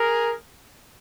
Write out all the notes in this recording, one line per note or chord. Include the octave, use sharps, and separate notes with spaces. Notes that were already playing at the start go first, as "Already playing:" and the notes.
Already playing: G#4 A#4